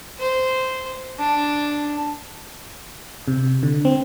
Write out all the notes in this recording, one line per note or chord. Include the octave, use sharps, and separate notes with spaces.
C5
D4
C3
D3
C4